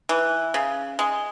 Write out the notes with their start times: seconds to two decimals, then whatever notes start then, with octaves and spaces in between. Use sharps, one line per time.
0.09 E3
0.54 C#3
0.99 G#3